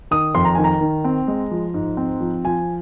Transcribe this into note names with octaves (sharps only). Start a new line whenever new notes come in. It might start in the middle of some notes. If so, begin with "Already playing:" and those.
D#3 D#6
F2 C6
A#5
D#3 G#5
A#5
D#3
C4
G#3
F3
G#2
C4
F3
F3 G#5